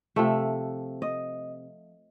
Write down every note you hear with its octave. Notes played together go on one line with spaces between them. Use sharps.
C3 F3 A3 E5
D#5